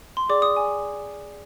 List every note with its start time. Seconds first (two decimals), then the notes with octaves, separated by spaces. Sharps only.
0.17 C6
0.29 G#4 D5 G5 D6
0.42 D#6
0.56 G#5